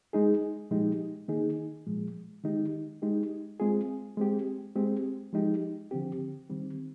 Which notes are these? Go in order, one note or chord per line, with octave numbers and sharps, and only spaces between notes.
G#3 D#4 G#4
A#2 F3 G#3 D#4 G4
D#3 A#3 D#4 G#4
A#2 F3 G#3
D#3 G#3 D#4 G4
G#3 D#4 G4
G#3 C4 F4 G#4
G#3 C4 G4
G#3 C4 G4
F3 G#3 D#4 G4
D3 F3 C4 G4
D#3 G3 C4